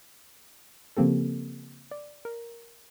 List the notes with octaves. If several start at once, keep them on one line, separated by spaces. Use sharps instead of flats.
C#3 F3 A#3 C4 G4 A4
D5
A#4